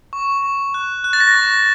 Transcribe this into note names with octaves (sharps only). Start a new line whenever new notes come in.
C#6
C#6
F#6
F#6
A6
A#6
C#6